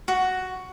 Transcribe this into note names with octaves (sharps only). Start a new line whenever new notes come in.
F#4